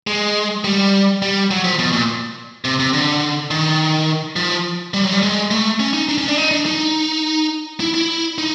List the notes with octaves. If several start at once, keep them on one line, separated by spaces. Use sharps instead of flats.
G#3
G3
G3
F#3
F3
B2
A#2
C3
C3
D3
D#3
F3
G3
F#3
G3
G#3
A3
C#4
D#4
D4
C#4
D4
D#4
D4
D#4
E4
E4
D#4